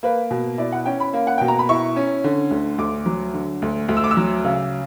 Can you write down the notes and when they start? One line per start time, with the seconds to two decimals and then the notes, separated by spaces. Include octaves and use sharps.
0.03 A#3 B4
0.31 B2
0.58 E4 D5
0.72 F#5
0.86 C#4 G5
1.00 B5
1.13 A#3
1.27 F#5
1.38 B2 G5
1.48 A#5
1.59 B5
1.69 E4 C#6
1.96 C#4
2.24 D3
2.51 D2
2.78 D2 D6
3.06 F#3
3.34 D3
3.62 D2
3.89 D2
3.97 E6
4.04 D6
4.11 E6
4.17 F#3
4.45 C#3